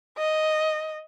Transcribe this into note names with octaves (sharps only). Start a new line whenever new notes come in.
D#5